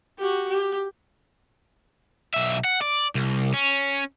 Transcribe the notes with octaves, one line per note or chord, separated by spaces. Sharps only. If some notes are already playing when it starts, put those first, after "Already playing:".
F#4 G4
G4
B1 E5
F#5
D5
C2
C#4